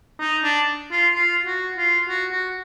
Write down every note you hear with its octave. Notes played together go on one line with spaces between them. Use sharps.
D#4
D4
F4
F4
F#4
F4
F#4
F#4